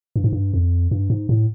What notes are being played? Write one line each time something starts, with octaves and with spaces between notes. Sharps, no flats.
G2
G#2
G2
F2
G2
G#2
A2